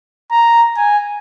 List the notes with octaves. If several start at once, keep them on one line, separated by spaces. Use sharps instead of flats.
A#5
G#5